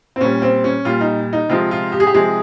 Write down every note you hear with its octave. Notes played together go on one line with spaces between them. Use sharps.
C4
A#2 G3 C#4
C4
C#4
A#2 G3 F4
D#4
D#4
C3 F3 G#3 F4
F4
G4
G#4
G4
C3 F3 G#3 G#4